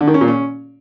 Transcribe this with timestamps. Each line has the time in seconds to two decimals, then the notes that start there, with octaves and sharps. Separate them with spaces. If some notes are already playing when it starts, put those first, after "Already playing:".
0.01 D3
0.07 D#3
0.14 C#4
0.21 A#2
0.28 C#4